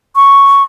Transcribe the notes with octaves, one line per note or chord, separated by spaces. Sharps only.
C#6